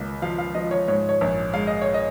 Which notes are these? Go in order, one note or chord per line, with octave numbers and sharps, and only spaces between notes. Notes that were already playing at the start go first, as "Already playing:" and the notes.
Already playing: C#2 A#3
F3 F5
F5
F3 D#5
C#5
G#2 C#5
C#5
A#1
G#3 F5
D#5
C#5
D#5